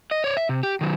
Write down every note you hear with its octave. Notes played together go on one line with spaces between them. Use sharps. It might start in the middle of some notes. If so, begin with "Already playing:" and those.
D#5
C#5 D5
E5
C3
G4
D#3 F#3